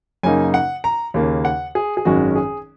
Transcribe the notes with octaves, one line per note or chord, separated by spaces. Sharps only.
F#2 C#3 A#3 D#4 G#5
F#5
A#5
D#2 C#3 A#3
F#5
G#4
G#4
G#1 F#2 D#3 G#3 C#4 F#4
G#4